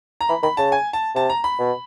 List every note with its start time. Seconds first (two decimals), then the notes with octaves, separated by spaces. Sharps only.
0.21 A#5
0.29 E3 B5
0.43 D#3 B5
0.57 C#3 A5
0.72 G#5
0.93 A5
1.15 C3 A5
1.30 A#5
1.44 B5
1.59 B2